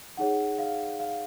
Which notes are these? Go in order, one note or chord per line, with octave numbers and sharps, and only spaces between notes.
D#4 G#4 C#5 F#5
F5
F5